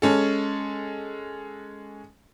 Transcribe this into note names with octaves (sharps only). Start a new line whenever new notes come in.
G#3 C#4 A4